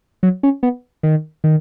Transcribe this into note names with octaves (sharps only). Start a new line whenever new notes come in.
F#3
C#4
B3
D#3
D#3